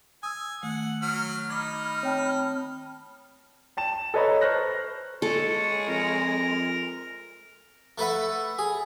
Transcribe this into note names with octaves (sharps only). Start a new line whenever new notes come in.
G#5 D#6 E6
D#3 A3 F#5
F#3 F6
D#4 B5 D6 F6 G#6
C4 C#5 G5 A5
G5 A5 E7
A4 B4 C#5 D#5 A#5 B5
C5 C#6 F6 F#6 A#6
G#3 A4 C#6
F2 A#4
A3 A4 B4 E5 F#5
G#4